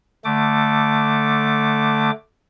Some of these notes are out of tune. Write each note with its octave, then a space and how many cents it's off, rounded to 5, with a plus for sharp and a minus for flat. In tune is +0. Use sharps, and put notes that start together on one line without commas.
D3 +0 A3 +0 D6 +5